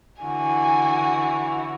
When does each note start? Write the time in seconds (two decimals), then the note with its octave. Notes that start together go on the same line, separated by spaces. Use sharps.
0.22 D3 E3 F#4 G#5